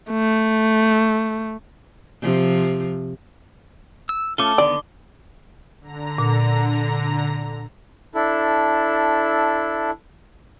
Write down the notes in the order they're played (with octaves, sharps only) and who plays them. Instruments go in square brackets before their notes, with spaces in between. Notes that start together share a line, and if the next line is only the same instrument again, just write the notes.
[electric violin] A3
[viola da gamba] C3 F3
[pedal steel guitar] E6
[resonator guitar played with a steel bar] A3 [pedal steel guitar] C#4 F4 [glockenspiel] D6 G7
[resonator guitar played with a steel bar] D3 [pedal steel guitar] D#3 B3 [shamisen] D5
[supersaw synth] D3 A#5
[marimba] A#2
[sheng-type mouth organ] D4 E4 A4